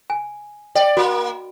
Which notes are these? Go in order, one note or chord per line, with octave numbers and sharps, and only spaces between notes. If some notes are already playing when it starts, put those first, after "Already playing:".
G#5
D5 G5
A#3 F#4 D#5 B5